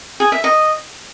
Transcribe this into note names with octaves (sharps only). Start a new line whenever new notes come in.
G#4
E5
D#5